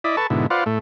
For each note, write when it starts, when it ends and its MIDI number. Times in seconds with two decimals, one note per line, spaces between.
0.04 0.16 64
0.04 0.16 74
0.04 0.16 75
0.04 0.16 83
0.17 0.27 69
0.17 0.27 71
0.17 0.27 81
0.17 0.27 85
0.30 0.47 44
0.30 0.47 47
0.30 0.47 50
0.30 0.47 64
0.50 0.64 65
0.50 0.64 71
0.50 0.64 72
0.50 0.64 74
0.50 0.64 77
0.50 0.64 78
0.66 0.79 45
0.66 0.79 57